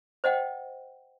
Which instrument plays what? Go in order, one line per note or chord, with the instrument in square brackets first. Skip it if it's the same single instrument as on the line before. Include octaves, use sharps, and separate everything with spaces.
[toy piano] C5 D#5 F#5 G5